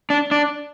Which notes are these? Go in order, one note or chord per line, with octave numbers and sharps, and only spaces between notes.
D4
D4